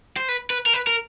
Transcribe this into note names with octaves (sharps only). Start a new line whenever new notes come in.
C5
B4
B4
A#4
B4
A#4